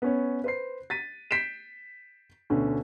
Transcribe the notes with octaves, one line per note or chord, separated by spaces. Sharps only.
B3 C#4 C#5
B4 C5 C7
A6 B6 D#7
G6 B6 C7 D7 E7
D2 B2 D3 C#4